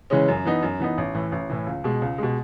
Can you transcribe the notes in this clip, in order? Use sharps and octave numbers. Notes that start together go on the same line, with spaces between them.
C#3 E3 G#3 C#4
F#2
E3 B3 D#4
F#2
E3 B3 D#4
A1
A2 E3
A1
A2 E3
C#2
B2 G#3
C#2
B2 G#3